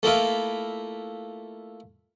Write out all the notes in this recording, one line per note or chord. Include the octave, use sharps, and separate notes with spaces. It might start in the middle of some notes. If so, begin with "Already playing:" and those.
A3 A#3 E4 F4